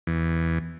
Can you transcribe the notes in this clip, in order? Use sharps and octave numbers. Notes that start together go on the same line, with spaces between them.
E2